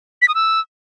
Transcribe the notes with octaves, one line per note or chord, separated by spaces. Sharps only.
B6
D#6
E6